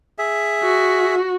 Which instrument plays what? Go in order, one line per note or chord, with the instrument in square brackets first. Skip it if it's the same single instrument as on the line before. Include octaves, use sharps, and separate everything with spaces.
[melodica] G#4 E5
[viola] F#4